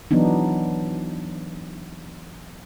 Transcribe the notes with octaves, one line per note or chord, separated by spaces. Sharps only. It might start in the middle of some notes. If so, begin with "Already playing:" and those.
E3 F#3 B3 D4 D#4